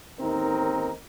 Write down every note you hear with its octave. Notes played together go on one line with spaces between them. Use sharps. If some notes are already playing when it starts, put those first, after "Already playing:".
A1 D#2 C4 D#4 A#4